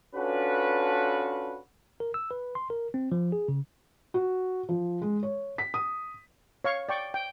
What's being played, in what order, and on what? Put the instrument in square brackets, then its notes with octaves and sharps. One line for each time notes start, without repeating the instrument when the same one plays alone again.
[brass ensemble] C#4 D4 F4 F#4 A4 B4
[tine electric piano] A#4
E6
B4
C6
A#4
C4
F3
G#4
C#3
[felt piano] F#4
F3
G#3
C#5
B6
D#6
[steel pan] C#5 F5 C#6
D5 G5 C#6
G5